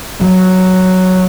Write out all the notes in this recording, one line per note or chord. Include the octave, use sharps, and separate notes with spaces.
F#3